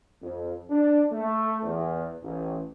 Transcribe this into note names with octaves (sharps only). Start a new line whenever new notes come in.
F2
D4
A3
E2
A1